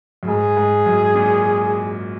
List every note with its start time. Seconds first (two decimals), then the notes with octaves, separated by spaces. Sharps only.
0.23 F#2
0.27 G#2 G#4
0.57 G#2
0.86 F#2
1.15 A#2